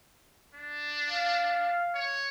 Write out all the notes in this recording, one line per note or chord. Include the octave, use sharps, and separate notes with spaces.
D4
F5
C#5